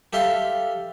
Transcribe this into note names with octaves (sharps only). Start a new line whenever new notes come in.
G4 A4 E5 F5 C6